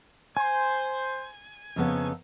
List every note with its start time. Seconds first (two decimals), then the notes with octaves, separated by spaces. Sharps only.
0.37 C5 G#5
1.76 F2 C#3 B3 C#4 D#4 A4